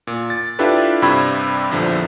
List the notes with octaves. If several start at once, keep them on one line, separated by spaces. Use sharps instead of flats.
A#2
A6
D4 E4 F4 G4 A4 B4
G2 C3 G3 B5 E6 G#6
A#1 E2 D3 F3